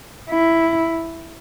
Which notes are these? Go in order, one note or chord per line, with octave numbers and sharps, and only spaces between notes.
E4